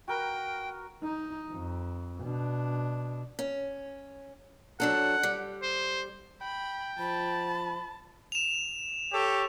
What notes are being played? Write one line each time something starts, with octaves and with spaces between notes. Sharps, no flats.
F#4 A#4 B4 G5
D#4
F2
B2 D4
C#4
F#3 D4 A4 F#5
G3
C5
G5 B5
F3 A5 B5
E7 F7
G4 A4 C#5